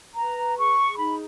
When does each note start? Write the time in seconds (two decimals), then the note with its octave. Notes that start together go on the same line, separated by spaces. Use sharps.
0.16 B4 A#5
0.57 G#4 C#6
0.98 D#4 B5